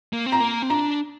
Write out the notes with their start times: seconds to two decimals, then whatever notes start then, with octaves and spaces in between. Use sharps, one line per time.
0.13 A#3
0.26 C4
0.32 A#5
0.40 A#3
0.62 C4
0.70 D4 A#5